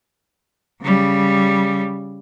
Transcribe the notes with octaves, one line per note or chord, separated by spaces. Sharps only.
C#3 G3